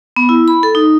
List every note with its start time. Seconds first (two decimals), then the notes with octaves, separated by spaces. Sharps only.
0.16 B3
0.29 E4
0.48 B5
0.63 A4
0.75 D#4